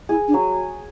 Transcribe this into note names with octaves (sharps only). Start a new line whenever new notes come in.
E4 G#4
D4
F#3